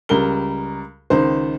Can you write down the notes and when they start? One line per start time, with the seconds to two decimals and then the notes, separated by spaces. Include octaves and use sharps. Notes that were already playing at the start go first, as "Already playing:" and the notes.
0.09 C#2 G3 A#4 G7
1.10 C#2 D#3 C5